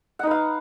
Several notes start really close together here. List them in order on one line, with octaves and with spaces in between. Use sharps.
F#5 D#4 B4 F5